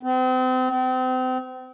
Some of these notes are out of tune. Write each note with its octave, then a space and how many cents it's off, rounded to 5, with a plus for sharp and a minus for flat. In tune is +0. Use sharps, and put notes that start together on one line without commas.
C4 -35
C4 -35